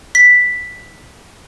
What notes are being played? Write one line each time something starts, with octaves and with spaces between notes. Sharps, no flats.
B6